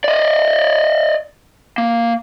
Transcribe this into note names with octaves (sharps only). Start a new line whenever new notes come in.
D5 D#5
A#3